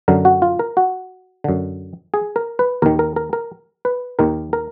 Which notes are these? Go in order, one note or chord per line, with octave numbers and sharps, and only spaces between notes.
F#2 D3 A#4
F#4
F4
A#4
F#4
F#2 D3
G#4
A#4
B4
D#2 D#3 A#4
A#4
A#4
A#4
B4
D#2 D#3 A#4
A#4